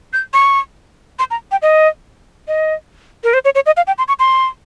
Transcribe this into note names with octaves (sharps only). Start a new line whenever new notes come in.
G6
C#6
C6
A#5
G5
D#5
D#5
A#4
C5
C#5
C#5
D#5
F5
G5
C6
C#6
C6